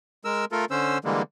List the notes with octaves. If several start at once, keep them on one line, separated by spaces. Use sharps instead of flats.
G#3 A#4 E6
A3 F4 A4 A#4
D3 C#4 C5 E6
D3 E3 G3 G#3 A#3